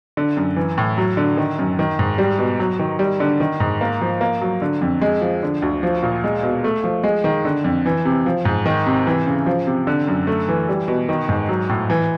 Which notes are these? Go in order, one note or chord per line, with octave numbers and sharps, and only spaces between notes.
D3
F#2
E3
A2
F#3
D3
D#3
F#2
D#3
G#2
G3
B2
F#3
D#3
G3
D3
D#3
G#2
A#3
F3
A#3
F#3
D3
F2
G#3
F3
D3
D2
F3
A#2
G#3
B2
A3
F3
G#3
D#3
D3
F2
E3
C3
F3
G#2
D#3
C3
E3
C#3
F3
C3
D3
F#2
A3
E3
G3
B2
D#3
G#2
F#3
A2
E3